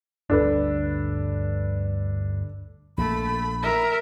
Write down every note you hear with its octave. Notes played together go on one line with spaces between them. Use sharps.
G1 D2 G2 D4 A4 B4
A#1 A3 A#3 B5
A#4 E5